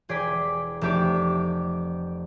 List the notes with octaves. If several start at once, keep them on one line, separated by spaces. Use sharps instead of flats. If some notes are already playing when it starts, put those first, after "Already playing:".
E1 G#4 D5 G5 B6
F1 A3 G4 D5